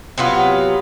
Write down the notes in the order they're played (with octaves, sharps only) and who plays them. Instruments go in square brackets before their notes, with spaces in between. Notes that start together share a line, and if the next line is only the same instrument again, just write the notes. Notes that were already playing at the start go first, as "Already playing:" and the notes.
[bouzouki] C3 F#3 B3 F4